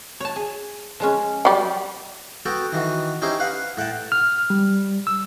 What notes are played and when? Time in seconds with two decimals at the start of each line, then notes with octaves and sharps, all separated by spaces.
0.20 C#5 A5
0.36 G#4
1.00 F3 G#3 C#4
1.45 F#3 G3
2.46 B3 F#4 A4 G5
2.72 D#3 E3 F#4
3.22 C#4 D#4 E4 G4 C5
3.40 B4 F5 F#5
3.77 A2 F#5 G5 A5
4.12 F6
4.50 G3
5.07 E6